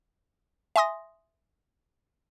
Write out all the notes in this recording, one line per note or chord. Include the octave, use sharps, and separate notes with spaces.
E5 G#5 C6 D#6 A#6